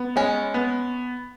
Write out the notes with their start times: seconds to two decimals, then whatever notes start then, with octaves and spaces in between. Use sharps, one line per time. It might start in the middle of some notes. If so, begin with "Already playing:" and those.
Already playing: B3
0.16 G#3 C#4
0.54 B3